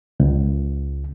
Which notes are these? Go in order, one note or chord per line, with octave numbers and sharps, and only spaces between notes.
C#2